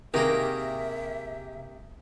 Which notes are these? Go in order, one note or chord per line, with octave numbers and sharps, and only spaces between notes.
C3 D#3 A#3 G4 G#4 A#4 E5